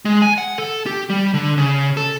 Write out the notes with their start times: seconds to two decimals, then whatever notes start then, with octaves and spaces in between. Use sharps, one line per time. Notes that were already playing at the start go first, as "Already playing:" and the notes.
0.05 G#3
0.22 G#5
0.38 F#5
0.58 A4
0.86 G4
1.10 G3
1.34 D3
1.58 C#3
1.97 A4